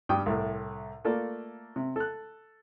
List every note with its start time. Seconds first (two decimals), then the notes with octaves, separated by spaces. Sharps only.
0.09 G2 G3 G5 D6 D#6
0.26 C2 A2
1.05 A3 A#3 F4 A4 D5
1.76 C3
1.96 A4 F#6